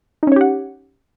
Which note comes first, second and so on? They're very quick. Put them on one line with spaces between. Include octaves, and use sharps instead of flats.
D#4 C#4 C#5 G4 F#5